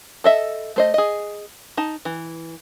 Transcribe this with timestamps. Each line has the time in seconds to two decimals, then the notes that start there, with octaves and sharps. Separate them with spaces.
0.24 A4 D#5 E5
0.76 A3 C5 D#5
0.94 G#4 D#5
1.77 D#4 A5
2.05 E3